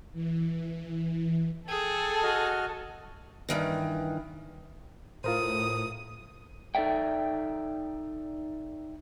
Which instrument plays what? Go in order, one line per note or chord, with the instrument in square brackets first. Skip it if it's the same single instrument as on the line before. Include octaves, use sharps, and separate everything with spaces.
[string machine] E3
[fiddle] G#4 [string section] A4 [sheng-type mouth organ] G5 E6
[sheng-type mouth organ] F#4 D#5 F6
[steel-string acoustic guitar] G2 D#3 E3
[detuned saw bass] A2 [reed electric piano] F4 A#4 C5 [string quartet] D#6
[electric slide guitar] D#4 A4 D5 E5 G5